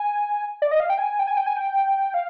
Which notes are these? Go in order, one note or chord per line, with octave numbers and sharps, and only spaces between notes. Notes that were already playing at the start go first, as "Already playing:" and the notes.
Already playing: G#5
D5
D#5
F5
G5
G#5
G5
G#5
G5
G#5
G5
F5